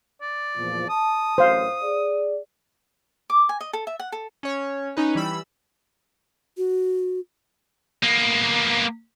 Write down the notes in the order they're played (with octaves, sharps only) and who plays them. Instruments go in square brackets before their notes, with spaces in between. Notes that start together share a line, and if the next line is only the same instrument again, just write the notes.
[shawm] D5
[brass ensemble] E2 A#2 F3
[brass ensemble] A5 [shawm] D#6
[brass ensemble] A1 F#2 [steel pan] C5 F5
[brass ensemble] G#4 D5
[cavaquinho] D6
G#5
D#5
A4
E5
F#5
A4
[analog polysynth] C#4 C#5
C#4 D#4 B4
E3 G3 B5 E6
[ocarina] F#4
[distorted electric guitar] A#3 B3